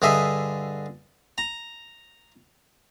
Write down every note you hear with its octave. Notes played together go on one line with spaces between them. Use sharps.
G2 D3 G#4 D#5 E5
A#5